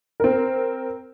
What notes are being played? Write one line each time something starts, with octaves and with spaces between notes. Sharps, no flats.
C4 A#4